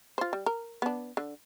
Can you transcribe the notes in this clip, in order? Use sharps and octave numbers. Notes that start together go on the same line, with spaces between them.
F4 C5
G3
A#4
B3 D4
D3